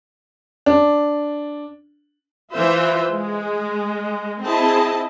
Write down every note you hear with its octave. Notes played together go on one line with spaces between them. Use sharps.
D4
E3 F4 C5 E5
G#3
C4 E4 G#4 D#5 A5